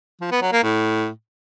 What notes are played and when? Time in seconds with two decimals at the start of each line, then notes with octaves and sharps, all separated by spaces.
0.21 F3
0.32 B3
0.42 F#3
0.53 A#3
0.63 A2